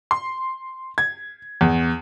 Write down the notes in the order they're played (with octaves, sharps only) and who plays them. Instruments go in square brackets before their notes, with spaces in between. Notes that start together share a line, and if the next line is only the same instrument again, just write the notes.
[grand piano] C6
G#6
E2